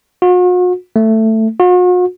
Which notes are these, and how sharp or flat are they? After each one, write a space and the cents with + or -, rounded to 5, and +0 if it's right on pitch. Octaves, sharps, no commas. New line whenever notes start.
F#4 -45
A3 +10
F#4 -45